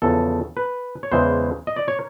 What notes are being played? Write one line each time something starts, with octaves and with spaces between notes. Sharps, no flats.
E2 C#3 F3 A4
B4
C#5
E2 C#3 E3 G#3 C5
D#5
D5
C#5